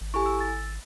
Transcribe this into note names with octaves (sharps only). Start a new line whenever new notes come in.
G#1
E4 G4 A4 G#5 C#6
E6
A6